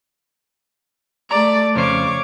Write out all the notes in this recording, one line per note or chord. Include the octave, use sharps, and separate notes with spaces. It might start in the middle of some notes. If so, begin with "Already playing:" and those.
A3 D5 A#5
F2 C#3 C5 C#5 D6